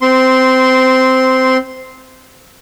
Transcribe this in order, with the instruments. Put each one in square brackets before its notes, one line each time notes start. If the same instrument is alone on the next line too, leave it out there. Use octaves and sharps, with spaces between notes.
[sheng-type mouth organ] C4 C6